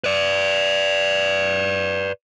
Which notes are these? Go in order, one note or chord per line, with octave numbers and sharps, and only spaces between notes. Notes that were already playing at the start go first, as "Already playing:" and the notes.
B4 D5